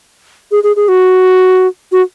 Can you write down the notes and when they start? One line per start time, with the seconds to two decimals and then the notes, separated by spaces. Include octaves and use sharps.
0.52 G#4
0.64 G#4
0.76 G#4
0.88 F#4
1.92 F#4